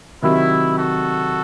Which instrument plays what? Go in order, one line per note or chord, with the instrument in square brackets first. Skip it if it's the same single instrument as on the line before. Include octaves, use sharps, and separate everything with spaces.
[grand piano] C3 D#3 F#3 [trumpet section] E4
[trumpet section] F#4 A4